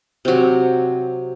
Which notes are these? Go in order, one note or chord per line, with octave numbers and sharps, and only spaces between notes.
C3 F#3